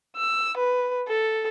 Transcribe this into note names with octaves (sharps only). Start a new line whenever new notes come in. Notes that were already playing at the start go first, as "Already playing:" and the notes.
E6
B4
A4